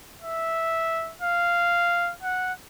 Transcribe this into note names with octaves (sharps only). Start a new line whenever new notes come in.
E5
F5
F#5